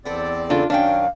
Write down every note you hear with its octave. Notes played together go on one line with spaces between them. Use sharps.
E2 B3 C4 A4 D5
C#3 D4 F4 A4
F#2 D#3 F#3 C#4 D4 F5 G5